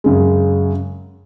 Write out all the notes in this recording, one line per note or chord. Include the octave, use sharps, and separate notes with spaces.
F#2 C#3 G#3